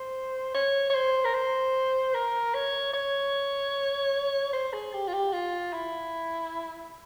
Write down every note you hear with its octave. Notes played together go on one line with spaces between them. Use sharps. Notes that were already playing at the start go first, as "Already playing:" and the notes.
Already playing: C5
C#5
C#5
C5
A#4
C5
A#4
C#5
C#5
C5
G#4
G4
F4
G4
F4
E4